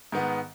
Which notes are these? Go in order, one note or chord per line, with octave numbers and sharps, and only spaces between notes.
G#2 D#3 B3